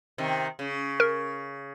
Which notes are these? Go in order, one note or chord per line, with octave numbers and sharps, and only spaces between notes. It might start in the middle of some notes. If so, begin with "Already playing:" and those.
C3 D#3
C#3
A#4